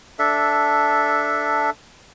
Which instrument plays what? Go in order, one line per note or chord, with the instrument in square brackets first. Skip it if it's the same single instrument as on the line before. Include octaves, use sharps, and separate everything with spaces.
[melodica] D4 A4 E5